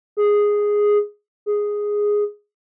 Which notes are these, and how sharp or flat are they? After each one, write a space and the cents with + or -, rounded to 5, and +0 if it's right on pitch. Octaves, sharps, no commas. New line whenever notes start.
G#4 -5
G#4 -5